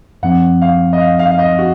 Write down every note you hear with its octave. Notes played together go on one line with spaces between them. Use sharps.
F#2 F3 C4 F#5
F5
D#5
F5
F5
F5
D#5
F#4